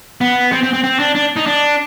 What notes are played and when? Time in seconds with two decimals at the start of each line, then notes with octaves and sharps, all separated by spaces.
0.21 B3
0.52 C4
0.63 C4
0.73 C4
0.84 C4
0.99 D4
1.15 D4
1.36 D#4
1.46 D4